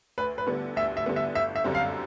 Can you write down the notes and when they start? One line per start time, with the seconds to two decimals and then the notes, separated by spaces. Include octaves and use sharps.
0.18 D2 B4
0.38 B4
0.47 D3 G3 B3
0.76 D2 E5
0.97 E5
1.06 D3 G3 B3
1.16 E5
1.35 G1 E5
1.56 E5
1.64 F#2 D3 G3 C4
1.75 F5